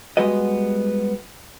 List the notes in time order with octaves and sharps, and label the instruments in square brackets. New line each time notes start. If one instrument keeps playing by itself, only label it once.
[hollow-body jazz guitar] G3 G#3 B3 F#4 B4 D#5